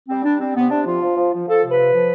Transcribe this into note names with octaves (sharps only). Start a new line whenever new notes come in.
G3 C4
G3 D4
G3 C4
C3 B3
C3 D4
F3 F4
F3
F3
F3
F3 A4
C3
B4
F3
F3